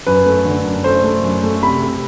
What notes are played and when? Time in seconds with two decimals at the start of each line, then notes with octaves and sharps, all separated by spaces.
0.07 F#2 B4
0.26 A3
0.45 D3
0.64 F#2
0.84 A3 C5
1.04 A3
1.23 F#2
1.43 A3
1.63 C3 B5
1.82 C3